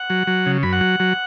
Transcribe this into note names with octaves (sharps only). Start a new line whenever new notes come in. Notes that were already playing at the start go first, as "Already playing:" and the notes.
Already playing: F#5
F#3
F#3
C#3
F#2 B5
F#5
F#3
F#3